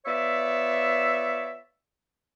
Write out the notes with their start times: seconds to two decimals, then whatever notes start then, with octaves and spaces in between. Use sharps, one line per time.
0.06 B3 F4 C#5 D5 E5